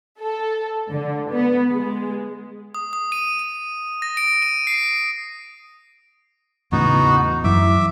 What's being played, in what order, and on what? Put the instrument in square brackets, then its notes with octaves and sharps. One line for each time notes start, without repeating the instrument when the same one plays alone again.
[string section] A4
D3
B3
G#3
[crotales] D#6
D#6
D#7
D#7
A#6
D7
D#7
C7
[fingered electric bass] E2 A2 C#3 [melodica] B3 D#4 F#4
[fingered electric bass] F#2 E3 [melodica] E5 D6